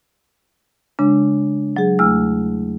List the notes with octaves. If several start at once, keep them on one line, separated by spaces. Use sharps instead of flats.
C#3 G#3 D4
F#3 G#4
E2 A3 E6 F6